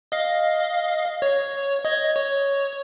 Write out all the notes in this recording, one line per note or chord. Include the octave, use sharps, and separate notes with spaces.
D#5 F5
C#5
D#5 G#6
C#5